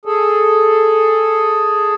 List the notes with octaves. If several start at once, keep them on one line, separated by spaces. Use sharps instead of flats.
G#4 A4